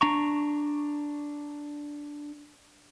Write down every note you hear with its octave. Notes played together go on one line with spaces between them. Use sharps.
D4 A#5 C#6